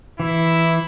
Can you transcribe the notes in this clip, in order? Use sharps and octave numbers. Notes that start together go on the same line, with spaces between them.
E3 E4